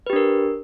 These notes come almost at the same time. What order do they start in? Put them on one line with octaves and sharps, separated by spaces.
B4 G4 D4 A#4